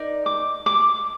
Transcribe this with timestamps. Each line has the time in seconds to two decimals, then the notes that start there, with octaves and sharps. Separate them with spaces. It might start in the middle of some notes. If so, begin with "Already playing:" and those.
Already playing: D#4 A#4 D5
0.26 D6
0.66 D6